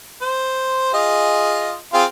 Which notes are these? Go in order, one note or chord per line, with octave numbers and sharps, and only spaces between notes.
C5
F4 G#4 D#5
C4 F4 G#4